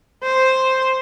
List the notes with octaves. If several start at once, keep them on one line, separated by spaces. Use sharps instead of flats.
C5